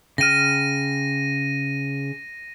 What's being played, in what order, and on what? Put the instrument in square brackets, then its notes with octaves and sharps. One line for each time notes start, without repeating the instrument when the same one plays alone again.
[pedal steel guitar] C#3 G5 F6 [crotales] A#6 D#7